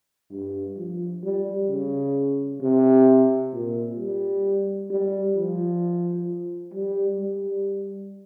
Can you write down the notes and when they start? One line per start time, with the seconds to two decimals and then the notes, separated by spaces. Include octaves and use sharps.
0.32 G2
0.78 F3
1.24 G3
1.69 C#3
2.61 C3
3.52 A#2
3.99 G3
4.90 G3
5.36 F3
6.74 G3
7.20 G3